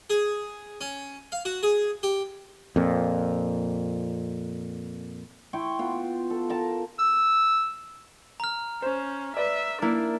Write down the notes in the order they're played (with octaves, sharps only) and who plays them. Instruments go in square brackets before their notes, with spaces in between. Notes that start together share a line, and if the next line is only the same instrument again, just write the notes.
[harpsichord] G#4
C#4
F5
F#4
G#4
G4
[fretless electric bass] F2 A#2
[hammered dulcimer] E4 G5 C6 C#6
B3 F4
A4
A#4 A5
[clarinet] E6
[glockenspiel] A#5 F6
[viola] C#4 [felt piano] C5
[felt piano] B4 D5 [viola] E5
[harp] A#3 E4 [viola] D4